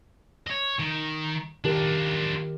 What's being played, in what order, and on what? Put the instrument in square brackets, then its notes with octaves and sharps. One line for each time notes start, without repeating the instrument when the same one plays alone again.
[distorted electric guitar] C#5 D#5
D#3
[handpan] D#3 G4 A#4 [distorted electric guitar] D4 F4